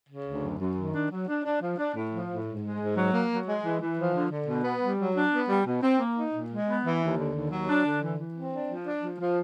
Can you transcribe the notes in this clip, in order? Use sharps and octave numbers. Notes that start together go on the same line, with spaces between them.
C#3
D2
F#2
F#2
D#3
D4
F#3
D4
D4
F3
D4
A2
F3
A2
G#2
G#3
G#2
F#3
A#3
F#3
G#3
E3
E3
F3
D3
D3
B2
B3
G3
F#3
D4
B3
G3
B2
C4
A#3
D#4
A#2
G#3
B3
E3
D#2
D3
D#2
F#3
D4
D3
E3
E3
C4
D4
F3
D4
F3
F3